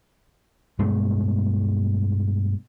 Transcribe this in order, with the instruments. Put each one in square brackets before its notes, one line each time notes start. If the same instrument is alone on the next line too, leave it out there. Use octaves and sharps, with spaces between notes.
[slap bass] G2 B2 G#3 A3